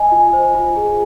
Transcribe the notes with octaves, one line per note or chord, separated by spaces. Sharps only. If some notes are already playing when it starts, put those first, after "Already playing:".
Already playing: D#5 G#5
F4
C5
F4
G#4